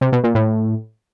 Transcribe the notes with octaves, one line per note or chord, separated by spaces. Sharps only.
C3
B2
A#2
A2